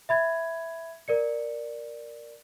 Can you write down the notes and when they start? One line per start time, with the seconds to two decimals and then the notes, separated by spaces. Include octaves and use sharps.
0.09 E5 B5 G#6
1.08 A#4 D5 C#7